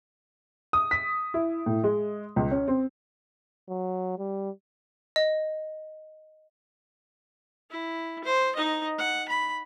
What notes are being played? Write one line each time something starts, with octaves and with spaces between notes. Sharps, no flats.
D#6
B6
E4
A2
G#3
C#2
C#4
C4
F#3
G3
D#5
E4
C5
D#4 D#5
F#5
B5